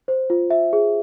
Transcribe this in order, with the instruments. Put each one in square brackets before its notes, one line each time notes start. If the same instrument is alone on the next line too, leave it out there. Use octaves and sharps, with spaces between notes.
[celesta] C5
F4
E5
G#4